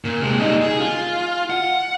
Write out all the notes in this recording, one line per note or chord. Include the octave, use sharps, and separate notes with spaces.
A#2
C3 G#3
G3 D#4
G#4
F4
F#5